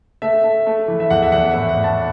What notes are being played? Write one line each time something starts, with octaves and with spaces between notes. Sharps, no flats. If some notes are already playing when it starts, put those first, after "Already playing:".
A3 E5
A3
A3
E3
E5
E2 F#5
E5
E2 F#5
A2 E5
F#5
A2
A5